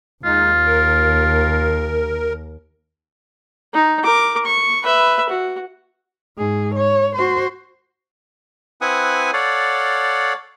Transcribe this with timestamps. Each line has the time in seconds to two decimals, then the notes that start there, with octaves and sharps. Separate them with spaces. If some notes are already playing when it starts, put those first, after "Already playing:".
0.24 D#2 G#3 D#4 F4
0.65 A#4
3.74 D#4
4.03 A#4 D6
4.45 C#6
4.83 B4 E5
5.29 F#4
6.38 G#2 G#4
6.75 C#5
7.16 F#4 C5
8.81 C4 E4 B4 F#5 G#5 D#6
9.33 A4 C#5 D5 F5 F#5